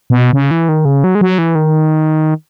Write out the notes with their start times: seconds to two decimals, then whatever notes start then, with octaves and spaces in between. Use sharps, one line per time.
0.10 B2
0.33 C#3
0.51 E3
0.69 D#3
0.85 C#3
1.04 F#3
1.15 G#3
1.21 F#3
1.38 E3
1.55 D#3